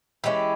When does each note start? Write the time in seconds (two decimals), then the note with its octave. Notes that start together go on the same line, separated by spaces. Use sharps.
0.24 E3 G#3 C#4 G4